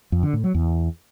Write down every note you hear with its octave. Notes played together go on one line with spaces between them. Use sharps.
F2
D3
A2
F#3
E2